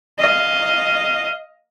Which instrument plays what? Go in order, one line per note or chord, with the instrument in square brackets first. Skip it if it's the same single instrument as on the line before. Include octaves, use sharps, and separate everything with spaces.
[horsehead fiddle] D#5 F5